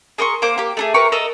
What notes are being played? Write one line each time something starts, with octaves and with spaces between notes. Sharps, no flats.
G#4 A#4 C6 C#6
A#3 C5 D6
A#3 G4
A3 D#4 G#4
G4 A#4 B4 C#6
A4 A#4 D#5 E6